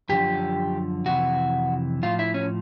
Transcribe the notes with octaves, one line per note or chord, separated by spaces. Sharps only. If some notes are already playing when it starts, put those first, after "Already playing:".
F#2 D3 F3 G4
F2 C3 E3 F#4
A2 F3 F4
E4
C#4